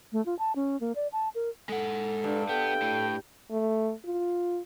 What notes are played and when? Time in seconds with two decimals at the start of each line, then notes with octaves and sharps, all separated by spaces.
0.12 A3
0.26 F4
0.39 A5
0.56 C#4
0.80 A#3
0.95 D5
1.12 A5
1.35 A#4
1.69 G#3 A4 F#5
2.24 G2
2.49 B3 A4 G5
2.82 A2
3.51 A3
4.05 F4